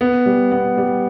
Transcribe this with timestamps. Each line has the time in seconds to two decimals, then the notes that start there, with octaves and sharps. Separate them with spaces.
0.01 B3
0.26 G3
0.52 B3
0.77 G3